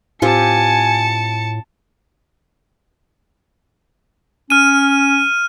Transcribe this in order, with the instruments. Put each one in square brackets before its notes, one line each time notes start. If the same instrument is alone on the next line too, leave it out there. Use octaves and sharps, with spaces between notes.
[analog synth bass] A2 [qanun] C4 F4 G4 [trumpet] G#5 [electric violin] A5 C#7
[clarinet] C#4 [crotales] F6 D#7